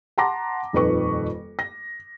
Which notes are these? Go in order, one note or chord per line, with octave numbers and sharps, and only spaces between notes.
F#5 A5 A#5 C6 D6 A#6
D#1 F2 D#3 B4 C#6
A#6